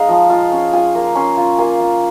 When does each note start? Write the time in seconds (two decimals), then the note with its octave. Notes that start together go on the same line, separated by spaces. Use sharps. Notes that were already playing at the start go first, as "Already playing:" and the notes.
Already playing: G#3 D#4 D#5 F5
0.09 F3
0.30 F4 F5
0.52 C#4
0.73 F4 G#5
0.95 A#3
1.15 C#4 C6
1.37 F4
1.58 A#3 G#5
1.80 F4